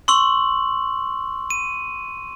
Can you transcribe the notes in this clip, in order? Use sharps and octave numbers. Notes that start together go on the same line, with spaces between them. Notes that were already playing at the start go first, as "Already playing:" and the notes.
C6 C#6 E6 F#7
D#7